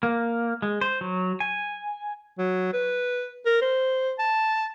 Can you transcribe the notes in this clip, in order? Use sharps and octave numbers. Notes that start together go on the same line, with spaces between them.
A#3
G#3
C5
F#3
G#5
F#3
B4
A#4
C5
A5